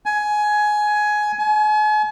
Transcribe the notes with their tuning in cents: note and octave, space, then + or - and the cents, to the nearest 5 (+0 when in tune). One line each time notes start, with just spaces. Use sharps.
G#5 +15
G#5 +40